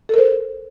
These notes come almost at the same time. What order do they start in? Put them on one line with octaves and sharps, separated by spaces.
A4 A#4 C5